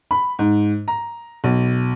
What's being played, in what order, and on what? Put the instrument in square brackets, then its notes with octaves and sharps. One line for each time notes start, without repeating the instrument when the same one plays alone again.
[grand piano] B5
G#2
A#5
B1